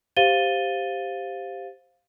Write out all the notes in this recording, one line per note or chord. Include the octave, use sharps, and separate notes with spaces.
G4 C5 F5 A6 D#7 G7